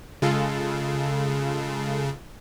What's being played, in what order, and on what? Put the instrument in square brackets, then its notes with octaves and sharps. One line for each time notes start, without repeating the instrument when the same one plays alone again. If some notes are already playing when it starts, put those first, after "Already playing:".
[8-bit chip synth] C#3 [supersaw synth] G#3 F4 A4